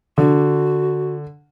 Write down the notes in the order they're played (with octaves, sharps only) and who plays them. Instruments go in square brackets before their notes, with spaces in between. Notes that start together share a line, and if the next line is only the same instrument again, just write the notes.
[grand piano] D3 [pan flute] F#4